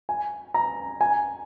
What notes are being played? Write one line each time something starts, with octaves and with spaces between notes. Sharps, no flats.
G#5
A#5
G#5